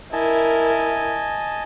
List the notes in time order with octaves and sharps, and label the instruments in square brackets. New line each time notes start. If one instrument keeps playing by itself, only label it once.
[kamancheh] E4 A#4 [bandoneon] D#5 G#5 A5